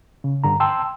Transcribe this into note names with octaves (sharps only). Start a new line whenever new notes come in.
C#3
G2 D3 A#5
G5 A5 C6 E6